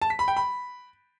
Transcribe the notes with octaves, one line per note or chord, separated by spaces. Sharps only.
A5
B6
B5
G5
B5